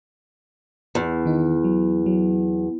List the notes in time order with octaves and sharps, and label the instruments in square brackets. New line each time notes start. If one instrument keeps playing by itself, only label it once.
[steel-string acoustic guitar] E2
[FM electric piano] D#3 D#4
F#3
F#3